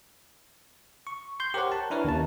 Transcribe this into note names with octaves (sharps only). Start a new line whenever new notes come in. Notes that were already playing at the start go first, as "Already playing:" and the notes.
C#6
C6 G6
G4 A#4 C5 C#5 F#5
A5
D4 E4 A#4 B4 C#5
D#2 C#4 A5